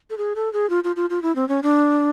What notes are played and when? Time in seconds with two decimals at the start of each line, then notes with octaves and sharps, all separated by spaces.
0.10 A4
0.18 G#4
0.36 A4
0.53 G#4
0.70 F4
0.84 F4
0.96 F4
1.10 F4
1.22 E4
1.36 C4
1.49 C#4
1.63 D4